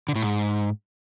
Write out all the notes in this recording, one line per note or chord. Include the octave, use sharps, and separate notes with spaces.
D3
A2
G#2